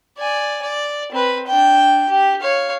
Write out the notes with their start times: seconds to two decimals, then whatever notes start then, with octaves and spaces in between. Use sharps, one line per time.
0.18 D5 G#5
0.62 D5
1.12 C4 B4
1.47 D4 G5
2.09 G4
2.41 C#5 F5